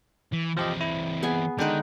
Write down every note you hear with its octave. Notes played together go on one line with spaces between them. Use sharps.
E3
E3 F3 C4 G4 D#5
E4
B3 G#4 G#5
D3 D#3 G#3 D#4 G5 F#6